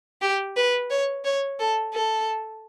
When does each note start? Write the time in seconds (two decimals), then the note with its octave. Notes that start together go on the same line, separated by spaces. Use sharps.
0.22 G4
0.56 B4
0.90 C#5
1.25 C#5
1.59 A4
1.93 A4